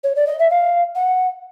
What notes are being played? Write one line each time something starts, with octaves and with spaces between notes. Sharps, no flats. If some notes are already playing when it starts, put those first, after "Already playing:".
C#5
D5
D#5
E5
F5
F#5